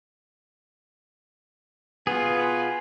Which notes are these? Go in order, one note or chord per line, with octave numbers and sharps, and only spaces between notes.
B2 B3 F4 G#4